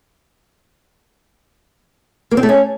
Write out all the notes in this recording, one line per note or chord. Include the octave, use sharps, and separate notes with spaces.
A#3
C4
A3
C#4